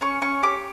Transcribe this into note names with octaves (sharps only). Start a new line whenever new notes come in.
C#4 C#6
C#4 C#6
G4 D6